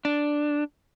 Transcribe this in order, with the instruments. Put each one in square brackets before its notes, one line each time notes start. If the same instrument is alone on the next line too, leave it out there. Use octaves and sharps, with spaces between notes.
[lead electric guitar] D4